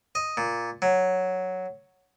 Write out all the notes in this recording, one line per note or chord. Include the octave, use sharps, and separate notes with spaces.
D#5
A#2
F#3